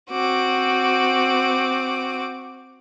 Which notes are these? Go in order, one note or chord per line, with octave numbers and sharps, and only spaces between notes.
C4 F#4 D6